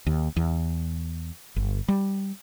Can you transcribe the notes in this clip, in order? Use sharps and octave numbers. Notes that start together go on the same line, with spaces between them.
D#2
E2
G1
G3